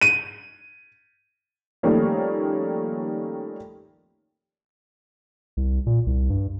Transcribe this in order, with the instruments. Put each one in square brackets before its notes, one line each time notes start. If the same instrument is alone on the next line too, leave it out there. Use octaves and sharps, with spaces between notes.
[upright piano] D#7
[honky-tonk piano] D#3 F3 G3 A3 A#3 C#4
[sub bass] C2
A#2
C2
G2